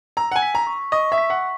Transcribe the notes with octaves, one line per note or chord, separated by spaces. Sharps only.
A#5 E6
F#5
G#5
B6
A#5
C#6
D#5 C#6
E5
B6
F#5